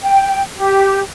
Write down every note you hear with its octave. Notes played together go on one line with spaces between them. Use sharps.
G5
G4